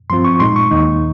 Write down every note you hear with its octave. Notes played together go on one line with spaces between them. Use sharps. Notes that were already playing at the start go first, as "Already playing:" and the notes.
G2 F3 C4 F4 C6
C#6
A#2 G#3 D#4 C6
C#6
D#2 D#3 A#3 D#4